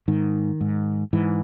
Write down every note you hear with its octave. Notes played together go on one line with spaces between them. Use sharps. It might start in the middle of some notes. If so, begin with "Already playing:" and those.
G#2 D#3
G#2
G#2 E3